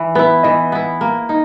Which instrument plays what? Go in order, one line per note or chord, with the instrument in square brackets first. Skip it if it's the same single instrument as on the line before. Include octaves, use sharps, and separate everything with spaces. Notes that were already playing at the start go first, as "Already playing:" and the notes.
Already playing: [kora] E3
[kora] B3 [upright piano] B4
[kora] E4
[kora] E3 [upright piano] D#5
[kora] B3 E4
A#3
D#4